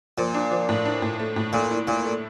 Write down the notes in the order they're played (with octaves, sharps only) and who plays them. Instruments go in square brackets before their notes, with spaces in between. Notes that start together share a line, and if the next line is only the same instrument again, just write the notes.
[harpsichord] A#2 [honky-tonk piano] F3
[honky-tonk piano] D4
F3
A2
D4
A2
A3
A2
[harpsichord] A#2 [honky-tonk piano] A3
[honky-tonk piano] E4
[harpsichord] A#2 [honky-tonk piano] E4
[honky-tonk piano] A3